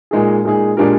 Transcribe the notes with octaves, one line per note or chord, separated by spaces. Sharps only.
A#2 G#3 D#4 G#4
A#2 G#3 D#4 G#4
A#2 G#3 D4 G4 A#4